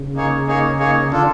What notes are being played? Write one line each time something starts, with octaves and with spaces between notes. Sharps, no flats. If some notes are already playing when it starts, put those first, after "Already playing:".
Already playing: C#3
A#3 D#4 G#4 C#5
A#3 D#4 G#4 C#5
A#3 D#4 G#4 C#5
D3 D4 F4 A4